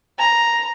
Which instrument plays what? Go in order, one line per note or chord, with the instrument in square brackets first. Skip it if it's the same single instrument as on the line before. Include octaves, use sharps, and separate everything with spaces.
[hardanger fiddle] A#5